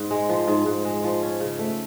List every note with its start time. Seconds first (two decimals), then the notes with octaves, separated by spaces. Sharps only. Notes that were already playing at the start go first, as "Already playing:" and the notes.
Already playing: G#2
0.11 G#3
0.29 F3
0.48 G#2
0.66 G#2
0.85 G#3
1.04 F3
1.23 C#4
1.40 C#3
1.59 A3